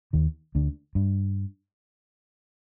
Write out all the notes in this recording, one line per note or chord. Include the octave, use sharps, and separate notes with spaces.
D#2 D#3
D2 D3
G2